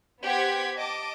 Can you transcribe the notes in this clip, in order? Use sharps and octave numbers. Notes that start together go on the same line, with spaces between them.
B3 G4 C5 F#5 G#6 B6
D#5 A5 D6